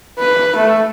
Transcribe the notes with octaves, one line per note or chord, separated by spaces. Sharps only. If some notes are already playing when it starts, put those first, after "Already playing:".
B4
A3